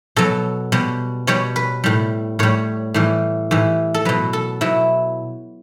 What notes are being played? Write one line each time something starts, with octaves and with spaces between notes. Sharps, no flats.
B2 F#3 A4
B2 G3
B2 G3 C#5
B4
A2 G3
A2 G3 C#5
A2 E3 G3
A2 E3 G3
A4
B2 F#3 B4
A4
B2 F#3 E4